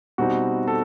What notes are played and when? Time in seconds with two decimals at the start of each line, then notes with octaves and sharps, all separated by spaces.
0.18 B2 G3 C4 D#4 F#4
0.68 A4